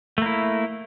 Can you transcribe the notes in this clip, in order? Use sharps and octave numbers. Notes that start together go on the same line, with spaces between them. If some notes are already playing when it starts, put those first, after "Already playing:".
A3 A#3 E4